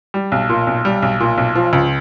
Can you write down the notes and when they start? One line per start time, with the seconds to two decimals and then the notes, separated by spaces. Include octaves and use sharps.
0.14 G3
0.32 B1
0.49 A#2
0.67 B1
0.85 G3
1.03 B1
1.20 A#2
1.38 B1
1.55 F3
1.73 C#2